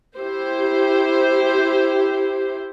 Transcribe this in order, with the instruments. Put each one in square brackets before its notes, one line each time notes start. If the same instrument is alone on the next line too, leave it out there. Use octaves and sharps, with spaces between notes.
[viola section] E4 G4 C5